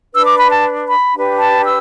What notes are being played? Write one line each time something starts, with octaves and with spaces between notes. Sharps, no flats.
D4 B4 E6
D6
B5
A5
B5
D4 G4 B4
A5
E6